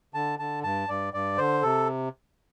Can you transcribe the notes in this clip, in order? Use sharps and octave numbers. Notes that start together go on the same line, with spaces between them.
D3 A5
D3 A5
G2 A5
G2 D5
G2 D5
D3 C5
C3 A4